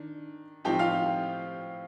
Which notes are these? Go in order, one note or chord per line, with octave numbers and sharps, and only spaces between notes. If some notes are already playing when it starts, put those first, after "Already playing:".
Already playing: D#3 D4
A2 F3 C4 D#4 G4 G5
F4 F5